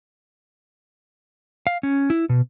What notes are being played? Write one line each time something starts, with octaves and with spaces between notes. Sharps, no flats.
F5
C#4
E4
B2